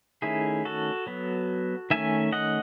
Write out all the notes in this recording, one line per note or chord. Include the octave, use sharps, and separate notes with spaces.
D#3 A3 C#4 E4 G#4
F#4 A4
F#3 B3
D#3 A3 C#4 E5 G#5
D#5 F#5